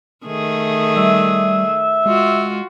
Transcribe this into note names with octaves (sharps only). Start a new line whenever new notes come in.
D#3 A3 G#4
G3 E5
G#3 F4 F#4